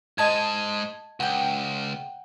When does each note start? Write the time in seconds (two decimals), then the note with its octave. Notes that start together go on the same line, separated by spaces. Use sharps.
0.18 G#2 G#3 D#5 A5 G#6
1.20 C#2 F#5 G5